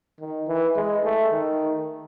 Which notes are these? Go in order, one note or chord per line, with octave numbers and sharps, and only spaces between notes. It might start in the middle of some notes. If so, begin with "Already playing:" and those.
D#3
E3
G#3
A3
D#3